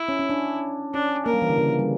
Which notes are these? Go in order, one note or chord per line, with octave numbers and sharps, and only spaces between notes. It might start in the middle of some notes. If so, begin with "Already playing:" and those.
Already playing: E4
C#4
C#4
D4
C#4 D4
A#3 A#4
G3
E3
D3
C#3
C#3
G3